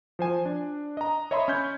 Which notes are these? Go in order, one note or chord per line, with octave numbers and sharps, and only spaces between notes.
F3 C5 G#5
D4
D#5 A#5
C#5 D#5 E5 B5 C6
C#4 B5 G6 G#6